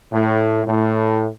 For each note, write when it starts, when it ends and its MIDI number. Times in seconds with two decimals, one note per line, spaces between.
0.12 0.62 45
0.67 1.28 45